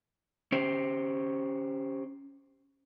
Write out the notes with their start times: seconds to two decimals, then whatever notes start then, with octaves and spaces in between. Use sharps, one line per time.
0.52 C#4 G4 C5